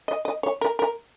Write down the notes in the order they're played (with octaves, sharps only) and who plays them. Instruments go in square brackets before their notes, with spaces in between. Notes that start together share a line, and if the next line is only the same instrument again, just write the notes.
[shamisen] D#5
D#5
C#5
A#4
A#4